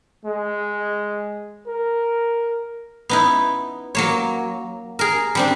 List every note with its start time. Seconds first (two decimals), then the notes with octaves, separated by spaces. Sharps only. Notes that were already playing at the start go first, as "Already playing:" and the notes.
0.25 G#3
1.67 A#4
3.09 B3 D#4 E4
3.95 F#3 A#3 C#5
4.99 G#4 A#4
5.35 G3 C4 D4